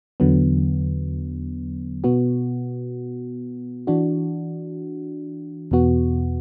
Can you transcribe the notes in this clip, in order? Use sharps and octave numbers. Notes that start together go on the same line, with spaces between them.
E2 D3 F#3 B3
B2 B3 F#4
E3 D4 F#4
E2 B2 B3 F#4